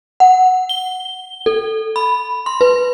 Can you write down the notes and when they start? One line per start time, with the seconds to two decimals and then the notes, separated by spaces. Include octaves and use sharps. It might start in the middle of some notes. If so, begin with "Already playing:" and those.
0.20 F#5
0.69 G7
1.46 A4
1.96 B5
2.46 C6
2.61 B4